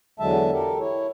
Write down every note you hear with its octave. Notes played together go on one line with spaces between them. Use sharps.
E2 D3 F#3 G#3 E5 A5
G4 A4 A#4
E4 C#5